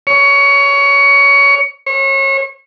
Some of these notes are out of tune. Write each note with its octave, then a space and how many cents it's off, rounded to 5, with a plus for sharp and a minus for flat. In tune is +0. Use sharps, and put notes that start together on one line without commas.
C#5 +20
C#5 -30